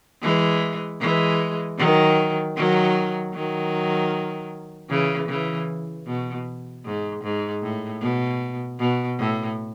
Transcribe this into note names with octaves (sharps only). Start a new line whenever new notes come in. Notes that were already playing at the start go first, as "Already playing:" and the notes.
E3 G#3
E3 G#3
D#3 F#3
D#3 F#3
D#3 F#3
C#3 E3
C#3 E3
B2
G#2
G#2
A2
B2
B2
A2